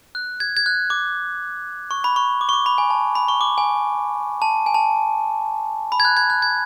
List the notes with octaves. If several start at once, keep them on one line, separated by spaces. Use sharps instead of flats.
F#6
G#6
G#6
F#6
D6
C#6
B5
C#6
D6
C#6
D6
B5
G#5
A5
B5
C#6
D6
G#5
A5
G#5
A5
B5
G#6
F#6
G#6
F#6
G#6